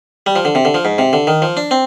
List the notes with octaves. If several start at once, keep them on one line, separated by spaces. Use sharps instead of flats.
G3
F3
D3
C3
D3
F3
G#2
C3
D3
D#3
F3
D4
C4